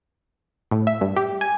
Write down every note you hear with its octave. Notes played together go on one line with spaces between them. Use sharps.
A2
E5
G2
G4
G#5